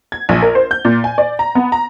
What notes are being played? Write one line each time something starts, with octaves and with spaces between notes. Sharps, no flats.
G#6
A#1
A#4
C5
G6
A#2
G#5
D5
A#5
B3
A#5